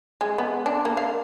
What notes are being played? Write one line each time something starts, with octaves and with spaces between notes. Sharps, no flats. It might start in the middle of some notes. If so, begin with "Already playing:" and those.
G#3
B3
D4
A#3
F5